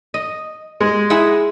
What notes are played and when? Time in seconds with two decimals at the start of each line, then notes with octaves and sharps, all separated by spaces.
0.14 D#5
0.81 G#3
1.10 E4 G#4 F#5